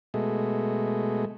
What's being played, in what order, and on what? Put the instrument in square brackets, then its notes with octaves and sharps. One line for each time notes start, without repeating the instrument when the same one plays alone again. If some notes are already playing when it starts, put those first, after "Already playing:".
[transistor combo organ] B2 G#3 A3